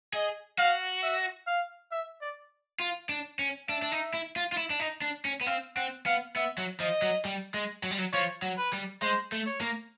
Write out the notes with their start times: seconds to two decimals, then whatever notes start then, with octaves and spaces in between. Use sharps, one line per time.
0.13 G#4 D#5
0.58 F#4 F5
1.03 E5
1.47 F5
1.91 E5
2.21 D5
2.80 F4
3.09 D4
3.39 C#4
3.69 D4 E5
3.82 D4
3.92 D#4
4.14 E4
4.36 F4
4.52 F4
4.57 E4
4.70 D4
4.80 D#4
5.02 D4
5.25 C#4
5.41 B3
5.46 C4 F5
5.76 C4 F#5
6.06 B3 F5
6.36 B3 E5
6.58 F#3
6.80 F3 D#5
7.02 F#3
7.25 G3
7.54 G#3
7.83 F#3
7.91 G3
7.98 F#3
8.13 F3 C#5
8.42 F#3
8.57 B4
8.73 G3
9.02 G#3 C5
9.32 A3
9.46 C#5
9.61 A#3